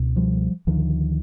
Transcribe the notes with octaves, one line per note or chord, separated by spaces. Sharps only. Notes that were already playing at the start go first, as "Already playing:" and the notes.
Already playing: C#2 B2
F3 G3
D2 D3 D#3 F3